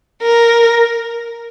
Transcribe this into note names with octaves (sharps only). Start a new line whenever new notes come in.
A#4